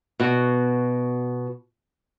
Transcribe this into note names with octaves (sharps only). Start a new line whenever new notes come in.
B2 F#4